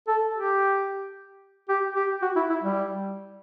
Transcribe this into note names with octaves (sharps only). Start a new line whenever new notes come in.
A4
G4
G4
G4
F#4
E4
E4
G3